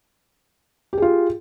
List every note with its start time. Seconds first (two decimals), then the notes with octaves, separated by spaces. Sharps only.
0.93 G4
0.98 G#4
1.02 F4